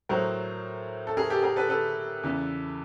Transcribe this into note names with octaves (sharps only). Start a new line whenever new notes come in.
A2 F#3 A#4 C5
A4
G#4 A#4
G4 A4
G#4 A#4
A4 B4
A4 B4
E2 C#3 E3